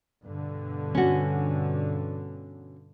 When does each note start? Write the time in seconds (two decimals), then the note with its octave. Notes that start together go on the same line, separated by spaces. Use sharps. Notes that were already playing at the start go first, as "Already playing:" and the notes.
0.24 G2 B2 D3
0.95 C#4 F#4